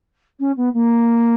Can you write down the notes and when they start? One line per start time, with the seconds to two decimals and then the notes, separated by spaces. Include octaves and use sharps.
0.39 C#4
0.57 B3
0.74 A#3